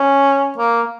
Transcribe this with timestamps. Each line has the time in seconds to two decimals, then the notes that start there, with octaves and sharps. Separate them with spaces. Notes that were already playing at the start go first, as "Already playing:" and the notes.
Already playing: C#4
0.58 A#3